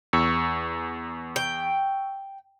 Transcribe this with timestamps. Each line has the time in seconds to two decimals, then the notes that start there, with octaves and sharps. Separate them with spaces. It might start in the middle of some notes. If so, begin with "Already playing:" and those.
0.13 E2 C#6 E6 C#7
1.36 G5